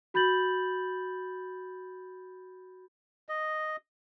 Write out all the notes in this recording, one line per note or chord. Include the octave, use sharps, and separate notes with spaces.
F#4 B5 G6 A6 F#7
D#5